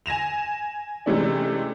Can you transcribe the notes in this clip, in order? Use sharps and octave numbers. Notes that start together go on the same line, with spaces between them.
G#5 A#6 E7 F7
C3 E3 G#3 A3 C#4 D4